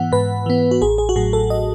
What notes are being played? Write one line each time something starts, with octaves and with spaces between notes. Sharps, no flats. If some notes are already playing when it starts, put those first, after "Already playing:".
Already playing: G#2 E3 B3 F#5
G#2 B4
E3 B3
F#4
A1 G#4
G#4
F#4
A2 F#3 G#4
A4
D#5